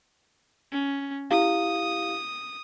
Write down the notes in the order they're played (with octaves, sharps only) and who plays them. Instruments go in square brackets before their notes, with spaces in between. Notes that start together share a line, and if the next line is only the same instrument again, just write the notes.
[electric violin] C#4
[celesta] E4 G4 F5 [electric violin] D#6